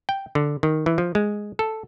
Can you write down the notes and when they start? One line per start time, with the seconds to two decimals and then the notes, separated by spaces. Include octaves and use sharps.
0.09 G5
0.35 D3
0.63 D#3
0.86 E3
0.98 F3
1.15 G#3
1.59 A4